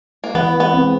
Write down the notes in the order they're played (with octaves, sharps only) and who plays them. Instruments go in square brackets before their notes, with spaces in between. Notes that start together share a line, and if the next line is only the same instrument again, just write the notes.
[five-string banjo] A#3
[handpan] E3 [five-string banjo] B3
[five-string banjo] B3
[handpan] G#3 C4